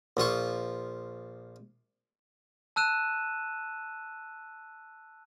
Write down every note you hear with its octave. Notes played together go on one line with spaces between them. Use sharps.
A#1 F3 F4 C#6
A5 E6 F#6 D#7 E7